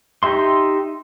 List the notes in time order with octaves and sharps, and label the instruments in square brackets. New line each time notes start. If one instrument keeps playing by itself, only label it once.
[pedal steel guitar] D#4 G4 E5 C6